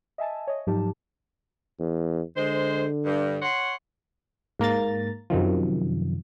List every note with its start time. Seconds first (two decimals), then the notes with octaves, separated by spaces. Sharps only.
0.18 D#5 E5 G#5 A5
0.47 C#5 D#5
0.67 G#2 F3 F#3 D#4 G4 A5
1.79 E2
2.37 D3 G#3 C5
3.05 G2
3.42 C#5 F#5 C6
4.59 G#2 A#3 A#5 A6
5.30 F#2 C3 D#3 F3